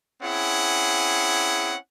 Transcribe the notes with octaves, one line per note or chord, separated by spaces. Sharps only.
C4 C#4 E4 G#4 F#5